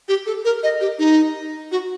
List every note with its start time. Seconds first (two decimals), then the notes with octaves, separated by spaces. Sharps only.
0.08 G4
0.26 A4
0.45 A#4
0.63 D#5
0.80 G4
0.99 D#4
1.72 F#4